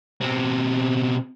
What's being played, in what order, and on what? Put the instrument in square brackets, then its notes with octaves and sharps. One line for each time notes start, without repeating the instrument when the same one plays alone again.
[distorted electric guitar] B2 C4